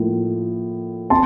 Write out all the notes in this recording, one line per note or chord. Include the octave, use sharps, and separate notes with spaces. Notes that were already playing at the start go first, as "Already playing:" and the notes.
Already playing: A2 F3 A#3
C4 A5 C6